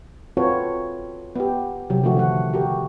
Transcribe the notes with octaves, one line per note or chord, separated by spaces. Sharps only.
C4 F4 F#4 A4 B4 C#5
B3 G4
C3 F#3 G4
D3 D#3 F3 A3 F#4
D3 D#3 F#5
F#4 G4 A#4